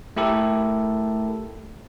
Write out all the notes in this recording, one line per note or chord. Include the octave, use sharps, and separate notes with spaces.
A3 E4 G4 A4 A#4